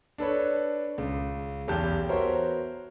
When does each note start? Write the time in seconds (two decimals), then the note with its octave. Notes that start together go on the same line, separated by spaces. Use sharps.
0.18 D4 A4 B4 C#5
0.98 C#2
1.68 B1 E2 G4 A5 G6
2.09 B3 F#4 A#4 C5 C#5 E5